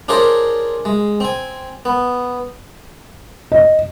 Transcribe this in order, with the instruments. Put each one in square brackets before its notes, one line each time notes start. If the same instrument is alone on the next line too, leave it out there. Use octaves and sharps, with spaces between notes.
[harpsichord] D4 F4 G#4 A#4 C5 C#5
G#3
C4 G#5
B3
[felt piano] D#5